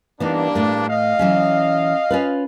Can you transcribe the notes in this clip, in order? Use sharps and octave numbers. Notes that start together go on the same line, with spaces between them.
G2 E3 A#3 B3 D4 D#4
A2 A3
D#5 F5
E3 F#3 C#4
C#4 F4 B4